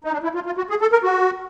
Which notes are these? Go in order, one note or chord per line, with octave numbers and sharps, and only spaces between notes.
D#4
D4
E4
F4
F4
F#4
G#4
A4
A#4
F#4